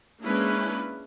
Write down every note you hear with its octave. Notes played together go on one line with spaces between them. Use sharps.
G#3 A#3 C#4 D4 E4 B4